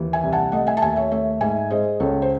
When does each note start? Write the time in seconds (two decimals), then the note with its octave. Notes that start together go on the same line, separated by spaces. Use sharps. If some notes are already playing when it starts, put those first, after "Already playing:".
Already playing: D#2 E3
0.13 E5 G#5
0.23 C2
0.33 F#5 A5
0.52 A3 D#5 F#5
0.67 E5 G#5
0.77 A5
0.82 D#2 E5 G#5
0.96 C#5 E5
1.11 A3 C#5 E5
1.41 G#2 E5 G#5
1.71 G#3 C5 D#5
2.00 C#2 A4 C#5
2.22 C5